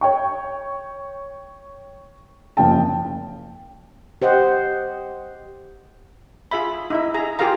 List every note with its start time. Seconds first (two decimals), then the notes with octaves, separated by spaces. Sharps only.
0.01 C#5 G5 C#6
2.57 F#1 F3 C#4 G5 A5
4.22 G4 C5 D#5 F#5
6.51 F4 G#4 E5 B5
6.90 D#4 E4 E5
7.14 G#4 A#5
7.39 F4 G4 G#4 A#4 F5 A#5